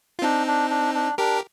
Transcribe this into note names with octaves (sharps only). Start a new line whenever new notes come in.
F4
C4 D4 D#4
D4
D4
D4
D4 G4 A#4